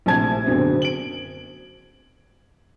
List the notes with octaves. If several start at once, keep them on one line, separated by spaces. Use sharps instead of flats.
A#1 A2 C3 A5 G#6
F#1 B2 D3 C4
D7 F#7